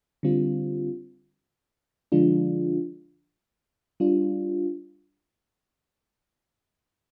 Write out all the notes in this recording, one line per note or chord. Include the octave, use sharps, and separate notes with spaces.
D3 G3 C4 F4
D3 F3 G#3 D4 F4
G3 D4 F4